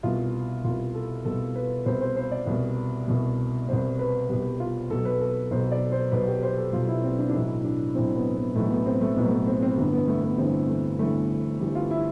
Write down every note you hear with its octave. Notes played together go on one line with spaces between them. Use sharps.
C2 B2 F4
C2 B2 F4
A4
C2 B2 A4
B4
C2 B2 C5
C5
C5
D5
C2 B2
C2 B2
C2 B2 C5
B4
C2 B2 G4
F4
B1 B2 A4
B4
A4
B1 B2 C5
D5
C5
B1 B2 B4
G4
C5
A4
B1 B2 F4
E4
C4
D4
D4
B1 A2 E3 E4
D4
B1 A2 E3 C4
B3
B3
B1 A2 E3 A3
B3
C4
A3
B1 A2 E3 B3
A3
B3
C4
C4
G1 G2 E3 B3
B3
A3
B3
G1 G2 E3 C4
A3
G1 G2 E3 A3
G1 G2 E3 G4
F4
E4